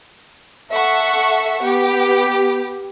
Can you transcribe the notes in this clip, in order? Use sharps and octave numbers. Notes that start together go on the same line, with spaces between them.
A4 E5 F#5 C#6
B3 G4